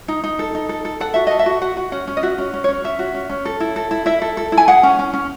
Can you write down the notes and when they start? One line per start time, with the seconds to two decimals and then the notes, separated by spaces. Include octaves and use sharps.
0.08 D#4
0.24 D#4
0.39 A4
0.55 D#4
0.69 A4
0.85 A4
1.00 A4 F#5
1.14 F#4 E5
1.27 A4 D#5
1.39 E5
1.46 F#4
1.61 F#4 F#5
1.77 F#4
1.92 C#4 F#5
2.07 C#4
2.17 D#5
2.23 F#4 E5
2.38 C#4
2.54 C#4
2.64 C#5
2.69 C#4
2.84 C#4 E5
2.99 F#4
3.14 C#4
3.29 C#4
3.45 A4
3.60 E4
3.76 A4
3.91 E4
4.06 E4 E5
4.22 A4
4.37 A4
4.52 E4
4.57 G#5
4.68 G#4 F#5
4.83 C#4
4.99 C#4
5.13 C#4